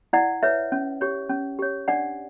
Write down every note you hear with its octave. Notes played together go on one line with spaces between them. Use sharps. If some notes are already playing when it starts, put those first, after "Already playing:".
E4 D5 F#5
B4 C#5 E5
C#4
G4 C#5
C#4
G4 C#5
D4 D5 F#5